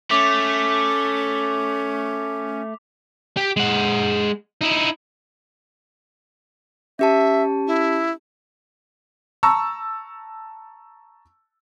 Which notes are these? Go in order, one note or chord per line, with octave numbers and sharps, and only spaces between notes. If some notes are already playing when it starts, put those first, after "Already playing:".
A3 C#4 D6 B6 F7
G4
G#3 F#5
D#4 E4
C#4 G4 E5 A5
E4
A5 A#5 C#6 E6